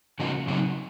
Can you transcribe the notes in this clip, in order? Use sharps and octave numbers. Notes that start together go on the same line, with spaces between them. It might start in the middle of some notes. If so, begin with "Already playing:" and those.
C#3 F3 A#3 D#4 F#4
C#3 F#3 C4 D#4